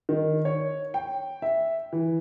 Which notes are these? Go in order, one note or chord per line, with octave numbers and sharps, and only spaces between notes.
D#3
C#5
G5
E5
E3